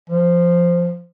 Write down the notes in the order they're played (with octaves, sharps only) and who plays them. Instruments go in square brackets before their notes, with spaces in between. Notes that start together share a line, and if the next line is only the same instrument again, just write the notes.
[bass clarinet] F3